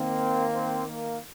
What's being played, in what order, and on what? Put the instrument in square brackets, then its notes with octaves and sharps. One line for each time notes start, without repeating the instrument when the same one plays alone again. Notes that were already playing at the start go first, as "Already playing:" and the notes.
Already playing: [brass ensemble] D#3 A#3 C4
C4
A#3